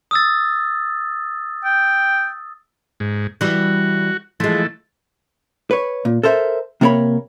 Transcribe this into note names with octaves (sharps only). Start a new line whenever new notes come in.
D#6 E6 A6
G5
G#2
E3 G3 F#4
E3 F3 G#3 A3
B4 C#5
A#2
A4 A#4 C5 E5
C3 A#3 F4 A#4 C#5 B5